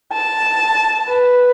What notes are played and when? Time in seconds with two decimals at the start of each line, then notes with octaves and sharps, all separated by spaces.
0.13 A5
1.09 B4